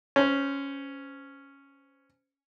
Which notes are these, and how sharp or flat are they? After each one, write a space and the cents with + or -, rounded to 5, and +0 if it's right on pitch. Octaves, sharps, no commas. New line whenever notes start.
C#4 +0 C5 -20